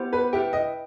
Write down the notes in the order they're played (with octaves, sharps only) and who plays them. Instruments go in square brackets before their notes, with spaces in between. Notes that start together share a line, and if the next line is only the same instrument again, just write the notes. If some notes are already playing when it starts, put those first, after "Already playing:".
Already playing: [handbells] B3 E4 G4 C5
[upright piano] B4
[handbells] E4 B4 E5 G5 [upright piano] G4
[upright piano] D#5